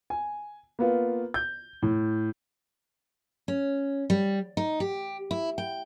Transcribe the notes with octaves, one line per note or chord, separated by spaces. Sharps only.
G#5
A#3 B3 F4
G6
A2
C#4
G3
D#4
G4
E4
G5